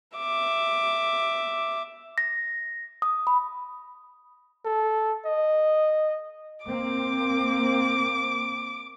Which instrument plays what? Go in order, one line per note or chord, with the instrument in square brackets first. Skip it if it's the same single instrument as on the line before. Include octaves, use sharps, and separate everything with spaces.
[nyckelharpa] E5 D6
[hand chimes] A#6
D#6
B5
[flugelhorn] A4
D#5
[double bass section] A#3 C4 [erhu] D6